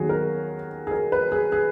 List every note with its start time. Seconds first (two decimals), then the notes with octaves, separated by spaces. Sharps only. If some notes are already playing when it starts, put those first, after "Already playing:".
Already playing: D#2 D#3 F#3 B3 F#4 G#4
0.09 A#4
0.87 G#4
0.91 A#4
1.12 B4
1.32 G#4
1.52 G#4